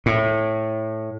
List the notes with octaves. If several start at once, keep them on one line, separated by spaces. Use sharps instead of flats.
A2